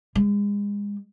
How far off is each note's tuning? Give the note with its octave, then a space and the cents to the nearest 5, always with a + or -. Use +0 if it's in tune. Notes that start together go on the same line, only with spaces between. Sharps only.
G#3 -30